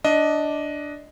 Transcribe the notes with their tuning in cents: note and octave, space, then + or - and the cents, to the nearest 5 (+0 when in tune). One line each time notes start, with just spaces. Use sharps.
D4 +0 D#5 +10